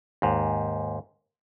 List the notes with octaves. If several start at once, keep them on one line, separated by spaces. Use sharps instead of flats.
D#2 G#2